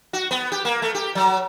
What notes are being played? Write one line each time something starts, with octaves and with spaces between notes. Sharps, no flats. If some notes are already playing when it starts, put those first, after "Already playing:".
F#4
B3
G4
A#3
A3
G4
F#3